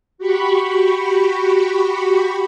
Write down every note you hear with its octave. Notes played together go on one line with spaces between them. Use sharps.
F#4 G4 B5 C#6